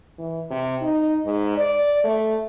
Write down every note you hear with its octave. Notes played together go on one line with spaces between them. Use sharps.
E3
C3
D#4
G#2
D5
A3